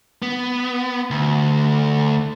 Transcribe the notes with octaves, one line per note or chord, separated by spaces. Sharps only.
B3
D2